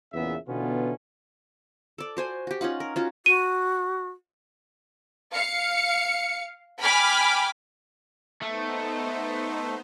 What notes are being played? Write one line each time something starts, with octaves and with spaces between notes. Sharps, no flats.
E2 A#2 C#3 B3 E5
B2 D3 E3 B3 C#4 F4
A4 D5
F#4 C5 G#5
F#4 G4
C#4 D#4 F4 F#5
A#4
C#4 F4 F#4
F#4 D#7
F5 C#7
G5 G#5 B5 D6 F6
A3 B3 D#4 C5